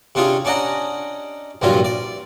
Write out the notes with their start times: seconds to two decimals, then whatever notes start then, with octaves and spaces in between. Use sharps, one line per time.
0.15 C3 C#4 D4 F4 G#4
0.45 C#4 D4 D5 D#5 F#5 A#5
1.62 C2 G2 A#2 F3 F#3 F4
1.85 D5